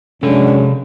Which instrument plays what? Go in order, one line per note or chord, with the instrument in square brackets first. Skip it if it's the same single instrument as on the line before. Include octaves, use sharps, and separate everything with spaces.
[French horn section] F#2 G#3 C#4 [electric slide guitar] C3 A4 [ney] D4